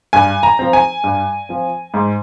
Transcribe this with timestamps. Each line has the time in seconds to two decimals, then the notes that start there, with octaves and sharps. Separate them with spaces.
0.13 G2 G#5
0.43 A#5
0.59 F3 C4
0.73 G#5
1.04 G2
1.49 F3 C4
1.94 G#2